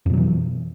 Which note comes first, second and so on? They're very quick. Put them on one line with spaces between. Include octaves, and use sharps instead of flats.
F2 B2 F#3 E3